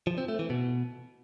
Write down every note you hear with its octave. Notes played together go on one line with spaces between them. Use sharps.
F3
C4
A3
E3
B2